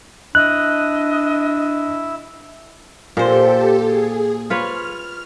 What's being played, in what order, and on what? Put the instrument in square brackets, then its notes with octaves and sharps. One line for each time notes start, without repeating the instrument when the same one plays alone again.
[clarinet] D4 [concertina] E4 [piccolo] D#5 [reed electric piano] F#6
[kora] A#2 C5 [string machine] G4 A4
[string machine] G#4
[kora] F4 B4 C#5 [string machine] F6